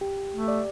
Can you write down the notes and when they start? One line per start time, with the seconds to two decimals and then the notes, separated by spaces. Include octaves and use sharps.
0.01 G4
0.32 A3
0.48 D5